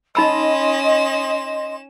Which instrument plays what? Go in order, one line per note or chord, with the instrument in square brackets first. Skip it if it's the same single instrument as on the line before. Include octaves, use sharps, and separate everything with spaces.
[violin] C#4 E7 [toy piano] D#4 B5 E6 [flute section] D#5 C6